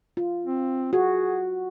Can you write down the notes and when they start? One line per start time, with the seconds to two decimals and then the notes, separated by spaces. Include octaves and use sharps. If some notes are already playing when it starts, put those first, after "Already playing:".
0.17 F4
0.45 C4
0.93 F#4 G#4